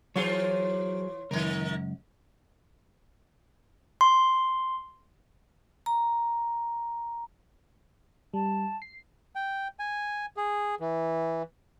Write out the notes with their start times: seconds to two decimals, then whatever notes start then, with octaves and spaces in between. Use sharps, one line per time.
0.16 E3 F#3 F4 G#4 C5 C#5
1.31 C#2 F#2 D#3 A#4
4.01 C6
5.86 A#5
8.34 G3 A5
8.82 C7
9.35 G5
9.79 G#5
10.37 G#4
10.80 E3